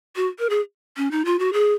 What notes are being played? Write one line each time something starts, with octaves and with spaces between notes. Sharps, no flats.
F#4
A#4
G#4
C#4
D#4
F4
F#4
G#4